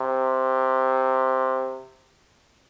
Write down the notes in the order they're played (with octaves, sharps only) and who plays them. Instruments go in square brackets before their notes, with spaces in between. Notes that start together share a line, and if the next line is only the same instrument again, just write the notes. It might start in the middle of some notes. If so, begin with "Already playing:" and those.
Already playing: [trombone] C3